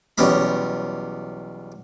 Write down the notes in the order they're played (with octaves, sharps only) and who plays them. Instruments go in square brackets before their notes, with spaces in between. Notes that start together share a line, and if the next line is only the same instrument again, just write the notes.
[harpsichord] B1 E2 G3 C#4 D#5 B5